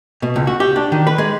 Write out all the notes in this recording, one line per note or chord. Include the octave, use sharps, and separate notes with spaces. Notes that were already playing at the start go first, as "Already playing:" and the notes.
B2
C#2
F#4
G4
D4
D#3
B4
G#3